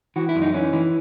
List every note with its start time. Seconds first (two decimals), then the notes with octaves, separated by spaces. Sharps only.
0.16 E3 F#4
0.29 E4
0.36 F#2
0.42 D#4
0.54 E3 C#4
0.73 E3